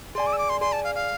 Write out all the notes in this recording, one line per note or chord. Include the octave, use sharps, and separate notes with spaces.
G#4 D5 G#5 C6
D6
E6
D6
C6
G#4 D5 G#5 C6
A5
F5
F5